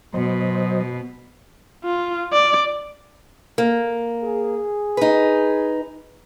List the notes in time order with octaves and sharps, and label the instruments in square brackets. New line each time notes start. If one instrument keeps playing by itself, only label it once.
[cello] B2 [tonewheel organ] F#3 C5 D#5
[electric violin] F4
D5
[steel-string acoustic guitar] A#3
[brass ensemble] G#4
[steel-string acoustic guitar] D#4 B4